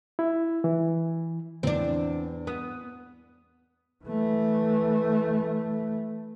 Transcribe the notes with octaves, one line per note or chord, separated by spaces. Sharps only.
E4
E3
E2 C4 D4
B3 D#6
E3 A3